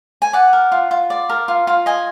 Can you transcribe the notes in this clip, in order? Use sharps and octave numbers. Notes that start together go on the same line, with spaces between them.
G#5
D5 F#5
A#4
F4
F4
D5
A#4
F4
F4
D#5 G#5